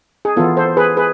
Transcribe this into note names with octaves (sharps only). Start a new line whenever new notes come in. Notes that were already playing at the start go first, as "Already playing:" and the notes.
G#4
E3 B3 F4 A4
A4 C5
G#4 B4
G#4 B4